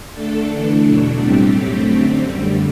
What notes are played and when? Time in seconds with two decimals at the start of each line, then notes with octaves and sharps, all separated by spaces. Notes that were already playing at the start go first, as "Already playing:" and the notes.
0.13 D3 A3 D4 A4
0.47 E3 A3 D4
0.83 E2 B2 F#3 A3 D4
1.18 A2 G3 C4 G4
1.53 F#2 F#3 A3 C4 G4
1.89 D3 A3 C4
2.25 F#2 D3 G3